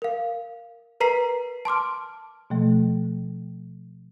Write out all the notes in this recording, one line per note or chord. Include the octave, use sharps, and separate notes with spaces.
A#4 F5
A#4 B4 A#5 B6 C7
A5 C6 D6 F6
B2 F3 A3